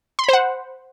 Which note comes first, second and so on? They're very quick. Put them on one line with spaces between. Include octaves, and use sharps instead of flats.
C6 B5 C5 F#5